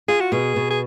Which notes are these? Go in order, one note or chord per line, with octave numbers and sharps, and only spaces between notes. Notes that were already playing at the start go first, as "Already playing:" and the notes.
F4 G#4
F#4
B2 G#4
B2
G#4